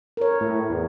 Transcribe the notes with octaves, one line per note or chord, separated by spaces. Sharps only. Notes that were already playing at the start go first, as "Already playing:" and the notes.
A#4 C#5
A2
E2